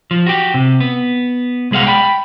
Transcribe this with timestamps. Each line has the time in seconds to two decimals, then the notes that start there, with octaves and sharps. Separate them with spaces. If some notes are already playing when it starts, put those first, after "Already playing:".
0.11 F3
0.27 F#4 G4
0.54 C3
0.80 B3
1.71 C2 G#3 G#4 F5 F#5
1.87 G5 B5